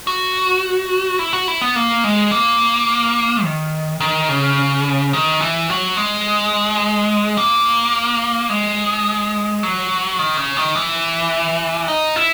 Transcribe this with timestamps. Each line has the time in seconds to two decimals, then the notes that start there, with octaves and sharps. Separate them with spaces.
0.07 F#4
1.19 E4
1.33 F#4
1.48 E4
1.62 B3
1.76 A#3
2.04 G#3
2.31 A#3
3.44 D#3
4.00 D#3
4.29 C#3
5.13 D#3
5.41 E3
5.70 F#3
5.97 G#3
7.37 A#3
8.50 G#3
9.63 F#3
10.19 D#3
10.37 C#3
10.57 D#3
10.75 E3
11.88 D#4
12.16 E4